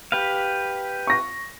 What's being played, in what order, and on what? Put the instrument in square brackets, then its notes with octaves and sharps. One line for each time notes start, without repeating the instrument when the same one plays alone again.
[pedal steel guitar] G4 B4 F5
[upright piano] C#6 A#6